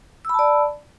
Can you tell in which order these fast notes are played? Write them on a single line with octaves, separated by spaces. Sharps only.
E6 B5 A5 D5